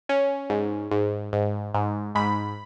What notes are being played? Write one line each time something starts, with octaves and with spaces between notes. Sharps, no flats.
C#4
G#2
G#2
G#2
G#2
G#2 B5